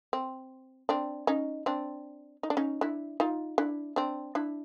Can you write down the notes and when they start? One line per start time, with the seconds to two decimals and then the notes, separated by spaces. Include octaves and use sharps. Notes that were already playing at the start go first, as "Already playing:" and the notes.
0.13 C4
0.89 C4 D4
1.27 C#4 D#4
1.66 C4 D4
2.43 D#4
2.50 D4
2.57 C#4 D#4
2.81 D4 E4
3.20 D#4 F4
3.58 D4 E4
3.96 C4 D4
4.35 D4 E4